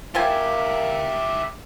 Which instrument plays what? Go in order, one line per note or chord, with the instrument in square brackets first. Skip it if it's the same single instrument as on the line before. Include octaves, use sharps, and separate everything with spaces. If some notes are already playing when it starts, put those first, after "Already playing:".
[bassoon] A#3 [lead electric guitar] E4 G4 [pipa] F4 G5 G#5 [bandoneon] E5